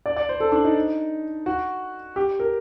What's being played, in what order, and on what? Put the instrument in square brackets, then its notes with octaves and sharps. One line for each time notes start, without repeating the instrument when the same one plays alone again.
[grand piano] D5
D5
C5
A4
D4
D#4
F#4
G4
A#4